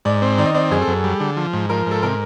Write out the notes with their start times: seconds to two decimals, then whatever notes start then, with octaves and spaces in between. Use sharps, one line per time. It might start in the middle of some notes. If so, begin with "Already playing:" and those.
0.05 G#2 D5
0.22 C4
0.38 D#3 D5
0.46 D#5
0.55 C4 D5
0.71 F#2 G#4
0.82 A4
0.87 F#2
1.04 G3
1.20 D3
1.37 F3
1.53 G#2
1.69 F3 A#4
1.86 G#2 A4
2.03 C3 A#4